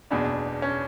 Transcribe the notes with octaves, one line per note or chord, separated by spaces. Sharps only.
F#1 E2 B2 D4
C#4